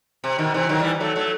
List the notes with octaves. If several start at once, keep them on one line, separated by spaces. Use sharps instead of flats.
C3
B2 D#3
C3 E3
D#3 F#3
E3 G3
F#3 A3
F#3 A3